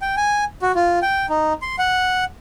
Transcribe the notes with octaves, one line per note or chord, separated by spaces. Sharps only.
G5
G#5
F#4
F4
G5
D#4
C6
F#5